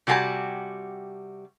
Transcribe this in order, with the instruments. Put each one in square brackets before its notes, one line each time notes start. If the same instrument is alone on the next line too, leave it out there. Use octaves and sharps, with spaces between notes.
[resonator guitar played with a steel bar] C3 G3 F#4 G4 G#5 A5